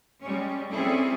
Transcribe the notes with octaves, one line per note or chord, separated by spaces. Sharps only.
G3 G#3 C#4
G3 C4 C#4 E4 G#4 A4